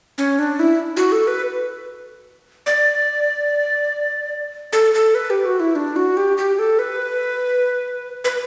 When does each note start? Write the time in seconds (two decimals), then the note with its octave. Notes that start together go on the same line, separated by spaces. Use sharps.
0.18 C#4
0.39 D4
0.59 E4
0.97 F#4
1.12 A4
1.27 B4
2.66 D5
4.73 A4
4.94 A4
5.15 B4
5.30 G4
5.46 F#4
5.60 E4
5.76 D4
5.96 F#4
6.17 G4
6.38 G4
6.59 A4
6.79 B4
8.24 B4